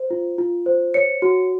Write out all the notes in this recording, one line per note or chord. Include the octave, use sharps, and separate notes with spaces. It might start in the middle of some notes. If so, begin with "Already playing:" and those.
Already playing: C5
F4
F4
C5
C#5 C#7
F#4